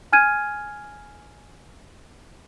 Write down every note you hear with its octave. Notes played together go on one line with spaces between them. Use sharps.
G#5 F6 G#6 D#7